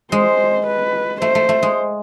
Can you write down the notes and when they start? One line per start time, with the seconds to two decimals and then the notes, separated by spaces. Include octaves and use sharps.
0.12 G#3 C5
0.67 B4
1.21 A3 C5
1.35 A3
1.49 A3
1.63 G#3